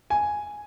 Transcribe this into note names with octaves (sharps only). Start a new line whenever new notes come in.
G#5